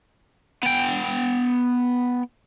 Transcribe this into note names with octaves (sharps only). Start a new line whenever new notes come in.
B3 G5